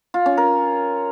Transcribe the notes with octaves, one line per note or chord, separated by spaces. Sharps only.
F4
C#4
A#4